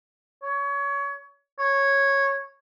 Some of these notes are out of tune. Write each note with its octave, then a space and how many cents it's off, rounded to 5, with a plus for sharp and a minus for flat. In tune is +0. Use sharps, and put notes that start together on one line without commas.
C#5 +25
C#5 -10